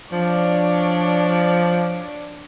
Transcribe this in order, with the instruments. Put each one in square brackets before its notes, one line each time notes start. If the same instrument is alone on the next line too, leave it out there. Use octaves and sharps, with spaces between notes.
[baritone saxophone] F3 [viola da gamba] D4 C#5 D5